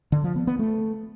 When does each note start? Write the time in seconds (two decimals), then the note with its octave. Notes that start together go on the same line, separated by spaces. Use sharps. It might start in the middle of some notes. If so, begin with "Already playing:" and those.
0.12 D3
0.24 F3
0.36 B3
0.47 B3
0.59 A3